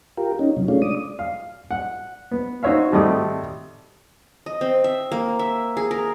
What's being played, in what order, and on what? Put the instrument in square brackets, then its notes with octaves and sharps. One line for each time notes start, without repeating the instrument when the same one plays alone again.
[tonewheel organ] F4 G4 A#4
C#4 D#4
C3 F#3
G#3 A3 C#4 D4 F4
D5 D#6
[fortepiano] F5
F#5
B3
D#4 F#4 C5 C#5 E5 F5
G#1 G3 A3 D5 D#6
[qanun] D#5
C4
E5
A#3
E5
G#4
A#4